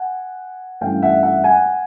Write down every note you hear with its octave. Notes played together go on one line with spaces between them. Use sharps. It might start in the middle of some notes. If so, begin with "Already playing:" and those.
Already playing: F#5 G#5
G2 E3 A3 C#4 E4 F5 G5
E5 F#5
E5 F#5
F#5 G#5